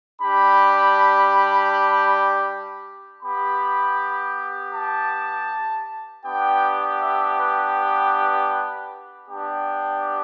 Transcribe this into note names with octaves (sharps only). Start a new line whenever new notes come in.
G3 D4 G4 B5
B3 G4 B5
A5
B3 D4 G4 G5
E5
B4
B4
B3 D4 G4